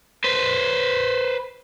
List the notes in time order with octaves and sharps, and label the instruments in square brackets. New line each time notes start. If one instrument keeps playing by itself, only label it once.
[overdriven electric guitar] B4 C5